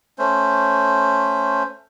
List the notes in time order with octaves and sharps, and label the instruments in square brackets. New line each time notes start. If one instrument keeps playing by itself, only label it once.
[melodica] A3 C#4 C5